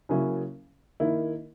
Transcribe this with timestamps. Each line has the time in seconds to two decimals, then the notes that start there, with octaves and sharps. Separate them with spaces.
0.09 C#3 F#3 A#3 C#4 E4
1.00 D#3 A#3 E4